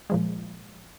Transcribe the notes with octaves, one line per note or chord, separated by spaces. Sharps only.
A#2 F3 G#3